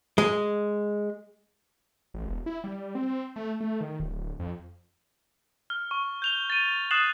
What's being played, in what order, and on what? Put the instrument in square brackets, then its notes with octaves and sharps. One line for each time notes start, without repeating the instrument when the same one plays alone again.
[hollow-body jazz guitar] G#3
[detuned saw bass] A1
E1
E4
G3
C4
A3
A3
D#3
D1
F2
[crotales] F6
C#6
G6 F7 G7
A6 D#7
D#6 F#6 A6 C7 E7 F#7